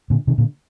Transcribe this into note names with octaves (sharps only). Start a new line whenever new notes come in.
A#2 D3
C3 D#3
A#2 D3